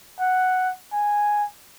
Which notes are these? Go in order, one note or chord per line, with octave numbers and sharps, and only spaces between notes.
F#5
G#5